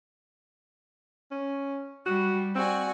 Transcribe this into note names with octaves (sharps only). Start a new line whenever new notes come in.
C#4
G3 F#4
C4 F#4 D5 G#5